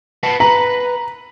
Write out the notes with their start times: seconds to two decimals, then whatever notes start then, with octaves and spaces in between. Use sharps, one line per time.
0.23 B4 F#5 A5
0.40 B4 A#5